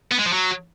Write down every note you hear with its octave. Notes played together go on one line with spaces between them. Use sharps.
B3
G#3
F3
F#3